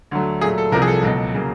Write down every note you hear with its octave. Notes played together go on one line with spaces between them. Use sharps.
D2 D3 F#3 A3
A#2 F#3 A3 G#4
A4
C2 C3 F3 A#4
G#4
A4
C#2 B2 F#3
C#3 F#3 A#3